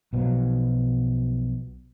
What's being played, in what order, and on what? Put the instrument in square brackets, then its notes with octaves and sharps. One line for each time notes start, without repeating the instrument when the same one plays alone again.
[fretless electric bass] B1 B2 F3 F#3